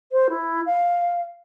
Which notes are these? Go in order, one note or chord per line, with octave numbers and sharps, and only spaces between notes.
C5
E4
F5